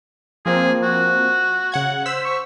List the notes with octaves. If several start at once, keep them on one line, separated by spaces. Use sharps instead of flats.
F3 A#3 C4 G#4
F#4
C#3 F#5 G#6
C5 E6 B6
C#6